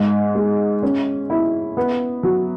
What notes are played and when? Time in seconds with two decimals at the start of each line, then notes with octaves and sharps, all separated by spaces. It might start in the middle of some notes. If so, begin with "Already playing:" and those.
Already playing: G#2
0.35 G#3
0.82 C#4
1.30 E4
1.77 B3
2.23 F#3